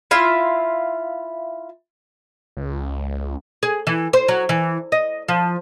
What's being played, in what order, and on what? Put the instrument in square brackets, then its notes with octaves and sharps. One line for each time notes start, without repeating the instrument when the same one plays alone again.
[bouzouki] E4 F4 E5
[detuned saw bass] C#2
[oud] G#4
E3
C5
F#3
E3
D#5
F3